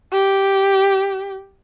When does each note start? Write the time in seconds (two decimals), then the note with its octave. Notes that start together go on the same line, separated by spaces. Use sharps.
0.12 G4